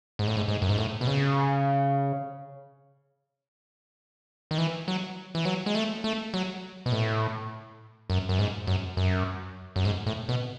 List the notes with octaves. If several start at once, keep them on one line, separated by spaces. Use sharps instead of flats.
G#2
A2
G#2
G#2
F#2
G#2
A2
B2
C#3
D#3
E3
F#3
E3
F#3
G#3
A3
A3
F#3
B2
A2
F#2
F#2
G#2
F#2
F#2
F#2
G#2
A2
B2